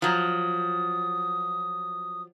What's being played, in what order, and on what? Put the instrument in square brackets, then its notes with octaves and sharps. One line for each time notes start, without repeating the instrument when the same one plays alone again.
[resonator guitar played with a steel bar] F3 F#3 [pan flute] D#6